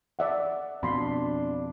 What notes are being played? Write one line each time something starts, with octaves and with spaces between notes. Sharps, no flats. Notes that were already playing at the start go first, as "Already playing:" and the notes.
D5 E5 F#5
F2 B2 D4 B5 C6